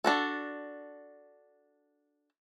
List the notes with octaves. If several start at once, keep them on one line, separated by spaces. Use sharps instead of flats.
D4 F#4 A4